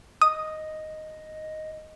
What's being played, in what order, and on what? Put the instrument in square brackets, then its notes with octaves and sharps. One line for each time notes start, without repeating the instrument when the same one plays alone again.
[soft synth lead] D#5 [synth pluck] D#6